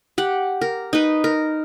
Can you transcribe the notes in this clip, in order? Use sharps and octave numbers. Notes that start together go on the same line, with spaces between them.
G4 F#5
A#4
D#4 B4
A#4